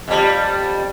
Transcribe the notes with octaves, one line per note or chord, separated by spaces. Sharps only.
F2 G3